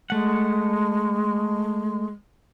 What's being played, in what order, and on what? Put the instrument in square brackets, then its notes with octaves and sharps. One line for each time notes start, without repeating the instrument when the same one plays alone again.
[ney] G#3 [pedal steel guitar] A3 F#5